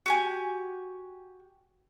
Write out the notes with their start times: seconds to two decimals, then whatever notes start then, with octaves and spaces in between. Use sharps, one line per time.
0.06 F#4 G4 G#5